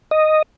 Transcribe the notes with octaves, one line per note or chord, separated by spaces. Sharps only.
D#5